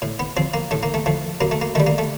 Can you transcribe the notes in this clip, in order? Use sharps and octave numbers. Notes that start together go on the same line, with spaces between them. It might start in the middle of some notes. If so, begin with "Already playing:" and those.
A2
B3
F3 C4
A#3
A2 A3
A#3
A3
F3 A3
F#2 A#3
A3
A#3
D#3 G3 A3
A#3
A3